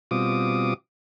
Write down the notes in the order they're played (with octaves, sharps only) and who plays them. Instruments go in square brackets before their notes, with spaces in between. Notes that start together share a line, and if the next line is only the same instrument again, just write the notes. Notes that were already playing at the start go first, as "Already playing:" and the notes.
[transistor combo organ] B2 G3 C4 F4 D6 D#6